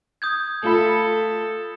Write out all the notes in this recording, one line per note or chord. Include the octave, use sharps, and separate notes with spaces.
D#6 G6 G#6
A3 F4 A4 B5